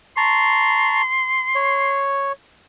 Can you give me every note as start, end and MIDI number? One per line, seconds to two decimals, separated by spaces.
0.17 1.02 81
0.17 1.02 82
0.17 2.02 84
0.17 1.02 85
1.55 2.32 73